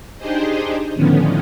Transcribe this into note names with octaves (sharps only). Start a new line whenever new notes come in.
D4 D#4 G4 G#4 C5 D#5
A2 D3 D#3 F3 B3 C#4